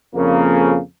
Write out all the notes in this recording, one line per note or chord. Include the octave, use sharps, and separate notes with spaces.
F2 C#3 A#3